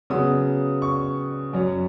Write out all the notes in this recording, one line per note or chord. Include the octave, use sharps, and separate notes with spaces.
C#3 F#3 B3 D#6
C#6
F#2 F#3 C#4